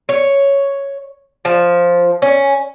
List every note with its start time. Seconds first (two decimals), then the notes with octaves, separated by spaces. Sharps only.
0.09 C#5
1.45 F3
2.22 C#4